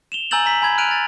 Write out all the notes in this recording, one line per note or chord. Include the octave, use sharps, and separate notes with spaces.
E7 F7 G7
G#5 A#5 E6 G6 A6 F#7
A#5 B6
G#5 B5 G#6
F6 F#6 D7 D#7 F7
A6